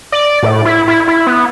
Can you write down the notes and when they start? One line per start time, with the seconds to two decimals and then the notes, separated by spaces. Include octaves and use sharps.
0.12 D5
0.43 A2
0.65 E4
0.88 E4
1.07 E4
1.27 B3